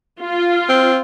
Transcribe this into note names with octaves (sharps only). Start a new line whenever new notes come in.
F4
C4